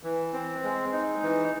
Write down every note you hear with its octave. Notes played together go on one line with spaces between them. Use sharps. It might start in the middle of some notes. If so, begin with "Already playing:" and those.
E3
C4
G#3
D#4
E3